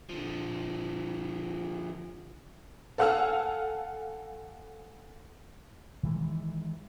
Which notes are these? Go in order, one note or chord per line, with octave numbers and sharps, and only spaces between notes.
D3 F3
A4 F5 F#5 G#5 E6 F6
D#3 E3 G#3